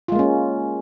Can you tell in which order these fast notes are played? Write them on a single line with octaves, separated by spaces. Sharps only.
F4 G#3 A#3 C#4